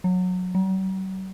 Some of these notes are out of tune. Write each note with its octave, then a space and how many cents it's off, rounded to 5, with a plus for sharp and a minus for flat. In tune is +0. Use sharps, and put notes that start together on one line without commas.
F#3 -20
F#3 +45